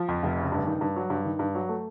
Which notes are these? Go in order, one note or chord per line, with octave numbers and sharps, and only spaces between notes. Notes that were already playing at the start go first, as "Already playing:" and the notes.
Already playing: F3
F2
F1
C#3
G2
D#3
G2
F#3
G2
D#3
G2
F#3
A3